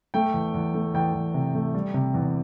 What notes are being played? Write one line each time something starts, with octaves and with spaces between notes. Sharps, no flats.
A3 G5
E2
E2
A3
E2 G5
E2
C3
A3
G3
C3
E2